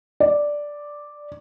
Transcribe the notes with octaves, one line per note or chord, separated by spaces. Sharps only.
D5